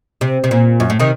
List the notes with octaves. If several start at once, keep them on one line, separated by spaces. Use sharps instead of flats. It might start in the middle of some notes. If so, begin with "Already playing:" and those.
C3
C3
A#2
F#2
A2
C3 D#3